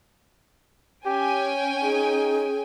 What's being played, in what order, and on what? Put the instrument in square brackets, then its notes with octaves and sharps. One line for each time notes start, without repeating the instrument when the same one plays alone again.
[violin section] C#4 G5 G#5 [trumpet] G4
[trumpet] D#4 [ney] G#4